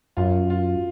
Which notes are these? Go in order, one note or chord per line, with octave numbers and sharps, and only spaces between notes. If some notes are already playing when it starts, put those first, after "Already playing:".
F#2 F4
F4